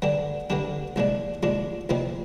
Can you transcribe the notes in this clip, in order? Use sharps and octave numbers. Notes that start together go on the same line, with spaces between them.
G2 D3 G3 D4
G2 D3 G3 D4
C2 A#2 F3 G#3 D4
C2 A#2 F3 G#3 D4
C2 A#2 F3 C4 D#4